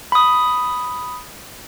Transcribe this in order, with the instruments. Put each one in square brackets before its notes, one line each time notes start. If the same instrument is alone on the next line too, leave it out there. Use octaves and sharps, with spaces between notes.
[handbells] B5 D#6